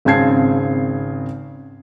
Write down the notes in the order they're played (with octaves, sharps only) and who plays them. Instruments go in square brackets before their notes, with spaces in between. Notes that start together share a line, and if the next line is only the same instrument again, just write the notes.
[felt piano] G#1 C#3 C4 A5 G#6 C7